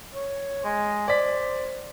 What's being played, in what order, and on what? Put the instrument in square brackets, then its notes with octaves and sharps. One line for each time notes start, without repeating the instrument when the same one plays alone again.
[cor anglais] C#5
G#3
[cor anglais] C5 [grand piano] D5 B6